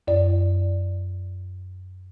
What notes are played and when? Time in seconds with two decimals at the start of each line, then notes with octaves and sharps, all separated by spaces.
0.07 F#2 D5